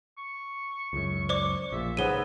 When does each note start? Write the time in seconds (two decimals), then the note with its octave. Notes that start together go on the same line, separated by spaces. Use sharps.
0.18 C#6
0.93 C#2 F#2
1.29 C5 D5 D6
1.72 A#1 A#2 E5
1.97 G#2 C#3 B3 D#7 G7